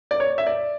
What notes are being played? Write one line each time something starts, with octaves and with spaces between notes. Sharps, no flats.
D5
C#5
E5
D5